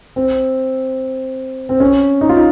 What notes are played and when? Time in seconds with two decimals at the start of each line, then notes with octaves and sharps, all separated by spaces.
0.16 C4
1.69 C4
1.80 C#4
2.21 D#4
2.29 F4
2.37 D#4